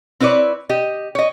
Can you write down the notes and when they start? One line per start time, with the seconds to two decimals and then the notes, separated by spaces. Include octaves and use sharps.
0.20 C4 E4 B4 C#5 D5
0.69 G4 D#5
1.15 C#5 D#5